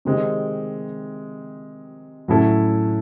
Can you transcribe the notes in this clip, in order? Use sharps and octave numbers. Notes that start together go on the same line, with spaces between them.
C3 D#3 G#3 C4 D#4
A2 F#3 C#4 E4 A4